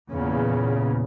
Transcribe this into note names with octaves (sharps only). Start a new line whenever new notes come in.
E2 A#2 C#3